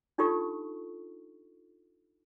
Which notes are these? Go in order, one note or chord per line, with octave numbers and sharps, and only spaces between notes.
D4 D#4 F4 G4 A4 C#6